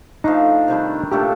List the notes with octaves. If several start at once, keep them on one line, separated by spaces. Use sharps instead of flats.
F3 A3 D4 D#4
C3 D#3 G3 D4
A#2 A3 D4 G4 A4